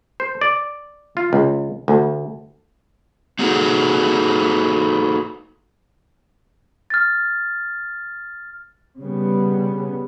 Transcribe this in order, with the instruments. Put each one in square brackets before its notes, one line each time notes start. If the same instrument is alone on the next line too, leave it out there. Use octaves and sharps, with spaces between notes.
[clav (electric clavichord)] C5
D5
F4
C#2
D2
[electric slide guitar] A#3 D#4 F#4 G#4 A4
[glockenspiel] F6 A6
[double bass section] C#3 G3 B3